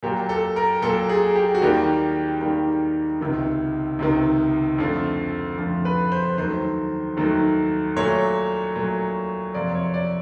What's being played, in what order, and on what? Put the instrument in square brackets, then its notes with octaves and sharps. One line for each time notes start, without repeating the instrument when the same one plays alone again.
[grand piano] A#2 F#3 A#3 G4
A4
A#4
A#2 F#3 A#3 A4
G#4
G4
F#4
D#2 D#3 G3 A#3 G4
D#2 D#3 G3 A#3
C#2 C3 D#3
C#2 C3 D#3
F2 D3 F3 A3
F2 D3 F3 A3
B4
C5
D#2 D#3 F#3 A3 C5
D#2 D#3 F#3 A3
A#2 F#3 A3 C#5
A#2 F#3 A3
F2 C3 F3 A#3 D5
C#5
D5